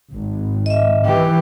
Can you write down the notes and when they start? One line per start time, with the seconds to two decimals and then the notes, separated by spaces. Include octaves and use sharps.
0.11 G#1
0.66 D#5 E5
1.05 E3 G4